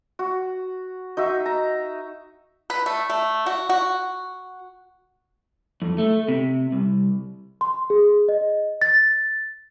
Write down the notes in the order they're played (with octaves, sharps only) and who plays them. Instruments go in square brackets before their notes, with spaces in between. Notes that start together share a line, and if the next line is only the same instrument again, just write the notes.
[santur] F#4
D#4 F#4 E5
A#5
[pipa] B4
A3
A3
F#4
F#4
[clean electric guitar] F2
A3
C3
C2
[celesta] C6
G#4
D#5
A6